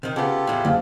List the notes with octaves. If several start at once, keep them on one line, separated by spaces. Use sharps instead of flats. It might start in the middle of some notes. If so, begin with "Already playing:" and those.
C3 D#3
C#3 B3 F4 G4 A4
E2 A2
F#1 E2 F5